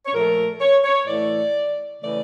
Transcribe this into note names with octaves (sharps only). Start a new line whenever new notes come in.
C#5
A#2 F3 A3 A#4
C#5
C#5
A2 E3 A3 D5
C#3 E3 A3 D5